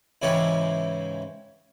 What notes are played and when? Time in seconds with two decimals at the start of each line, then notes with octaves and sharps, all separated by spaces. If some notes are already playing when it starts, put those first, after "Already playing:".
0.22 G#2 C#3 E3 E4 G4 C#5